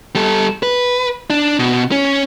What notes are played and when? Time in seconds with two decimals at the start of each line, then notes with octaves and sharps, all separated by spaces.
0.15 G3 A4
0.63 B4
1.30 D4
1.59 B2
1.92 C#4